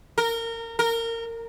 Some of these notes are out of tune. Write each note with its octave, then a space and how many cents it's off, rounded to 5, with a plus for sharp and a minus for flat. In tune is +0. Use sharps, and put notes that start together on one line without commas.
A#4 -25
A#4 -25